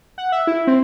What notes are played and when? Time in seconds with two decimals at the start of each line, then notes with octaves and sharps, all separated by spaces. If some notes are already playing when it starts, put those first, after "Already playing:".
0.18 F#5
0.32 E5
0.47 E4
0.67 C4